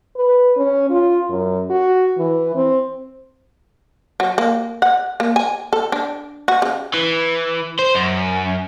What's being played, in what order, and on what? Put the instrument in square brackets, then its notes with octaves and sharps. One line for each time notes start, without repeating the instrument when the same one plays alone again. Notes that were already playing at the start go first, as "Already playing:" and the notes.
[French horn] B4
C#4
F4
F#2
F#4
E3
C4
[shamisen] F#3
A#3
F#5
A#3
G#5
A4
D4
F#4
C#3
[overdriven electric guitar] E3
C5
F#2